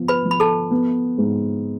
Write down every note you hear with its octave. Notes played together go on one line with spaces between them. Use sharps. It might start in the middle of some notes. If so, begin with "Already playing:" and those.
Already playing: F3 B3
B4 B5
F3
B5
A4 A5
B3
G#2